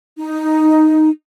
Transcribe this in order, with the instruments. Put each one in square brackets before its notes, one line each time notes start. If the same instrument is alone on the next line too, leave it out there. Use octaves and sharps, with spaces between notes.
[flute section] D#4